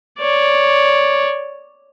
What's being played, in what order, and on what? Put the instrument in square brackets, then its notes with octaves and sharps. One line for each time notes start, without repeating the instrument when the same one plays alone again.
[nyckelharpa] C#5 D5